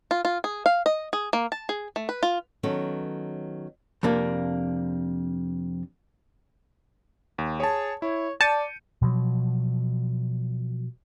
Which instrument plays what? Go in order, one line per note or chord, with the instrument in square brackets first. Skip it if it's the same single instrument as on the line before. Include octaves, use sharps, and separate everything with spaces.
[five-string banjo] F4
F4
G#4
F5
D#5
G#4
A#3
A5
G#4
A3
B4
F4
[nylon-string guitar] D#3 F#3 B3 C#4 A4
[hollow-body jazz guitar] F2 C3 A#3 D4
[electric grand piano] D#2
[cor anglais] G#4 [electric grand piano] C#5 A5
[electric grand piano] E4 [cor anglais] C#5
[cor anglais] D5 [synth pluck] A5 [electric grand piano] G6 C#7 D#7
[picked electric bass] B2 F3 F#3